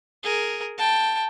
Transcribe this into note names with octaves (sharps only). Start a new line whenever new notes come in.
G#4 A#4
G5 A5